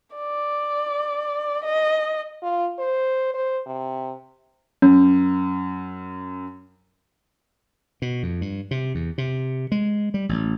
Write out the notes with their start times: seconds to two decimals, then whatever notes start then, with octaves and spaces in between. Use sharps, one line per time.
0.16 D5
1.64 D#5
2.43 F4
2.79 C5
3.34 C5
3.67 C3
4.82 F#2 C#4
8.02 B2
8.23 F2
8.41 G2
8.71 C3
8.95 E2
9.18 C3
9.72 G#3
10.14 G3
10.29 A1